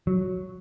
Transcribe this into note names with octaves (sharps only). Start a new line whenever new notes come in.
F#3